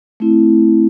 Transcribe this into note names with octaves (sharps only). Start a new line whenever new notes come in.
A3 C4 E4